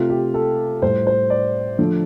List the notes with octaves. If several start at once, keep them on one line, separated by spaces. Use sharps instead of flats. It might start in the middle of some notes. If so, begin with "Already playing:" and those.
Already playing: C3 A3 F4
G4
A4
A2 G3 C5
C5
D5
D3 F3 A3